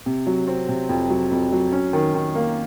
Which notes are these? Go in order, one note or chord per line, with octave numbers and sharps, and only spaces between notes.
C3
F#3
C4
C3
F2
F#3
F2
F#3
C#4
D#3
D#3
A#3